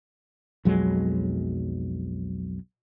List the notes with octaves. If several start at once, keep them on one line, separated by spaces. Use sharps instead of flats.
B1 F2 F#3 G#3